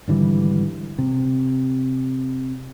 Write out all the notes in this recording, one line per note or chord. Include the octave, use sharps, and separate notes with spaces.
G#1 D3 E3 G3
C3